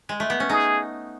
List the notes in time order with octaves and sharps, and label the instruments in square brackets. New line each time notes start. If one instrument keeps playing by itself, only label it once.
[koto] G#3
A3
B3
C#4
[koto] D#4 [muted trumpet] G#4